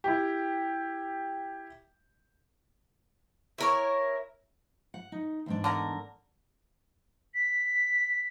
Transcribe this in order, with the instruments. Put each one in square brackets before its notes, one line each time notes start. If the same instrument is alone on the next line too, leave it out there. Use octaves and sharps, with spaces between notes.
[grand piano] E4 G4
[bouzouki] E4 A#4 C#5
[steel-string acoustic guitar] F#5
D#4
E2 G#2 D4
[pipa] D3 A#4
[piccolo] B6